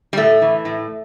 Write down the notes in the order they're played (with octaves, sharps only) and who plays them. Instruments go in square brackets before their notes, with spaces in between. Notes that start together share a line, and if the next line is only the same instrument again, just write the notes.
[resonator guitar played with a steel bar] G3
A2 A3
E3
A2